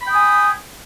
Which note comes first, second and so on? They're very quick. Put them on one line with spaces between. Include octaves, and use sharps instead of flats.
B5 G5 D#6 G#5